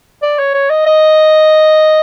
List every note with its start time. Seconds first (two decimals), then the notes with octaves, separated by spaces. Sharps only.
0.22 D5
0.39 C#5
0.54 C#5
0.70 D#5
0.86 D#5